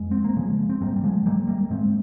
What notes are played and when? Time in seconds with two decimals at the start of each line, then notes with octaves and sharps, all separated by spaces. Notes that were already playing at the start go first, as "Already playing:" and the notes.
Already playing: F2 G#3
0.11 C4
0.24 A#3
0.36 C#3 F3 G#3
0.69 C4
0.81 G#2 G3 A#3
0.96 G3
1.04 F3 G#3
1.26 G3 A#3
1.48 G3 A#3
1.70 G#2 G#3 C4